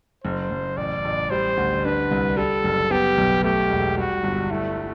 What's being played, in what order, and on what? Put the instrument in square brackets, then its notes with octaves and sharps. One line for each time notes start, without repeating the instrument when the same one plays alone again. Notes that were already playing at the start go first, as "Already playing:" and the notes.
[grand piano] F#1 [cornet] C5
[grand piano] F#1
[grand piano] A1 [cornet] D5
[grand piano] A1
[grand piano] G3 [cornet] C5
[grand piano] D2
[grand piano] D4 [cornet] B4
[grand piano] C2
[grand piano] G3 [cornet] A4
[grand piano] F#1
[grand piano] B3 [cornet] G4
[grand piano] B1
[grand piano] A3 [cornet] G4
[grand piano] E1
[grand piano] G3 [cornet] F#4
[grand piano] G1
[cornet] A3 [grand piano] E4